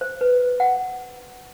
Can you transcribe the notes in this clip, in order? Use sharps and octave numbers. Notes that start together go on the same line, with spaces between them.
C5
B4
F#5